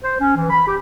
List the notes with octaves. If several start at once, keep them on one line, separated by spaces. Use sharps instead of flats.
C5
C#4
E3
B5
G4